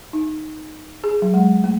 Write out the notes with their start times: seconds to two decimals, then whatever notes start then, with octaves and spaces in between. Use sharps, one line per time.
0.13 D#4
1.04 G#4
1.22 F#3
1.34 G#3
1.64 A3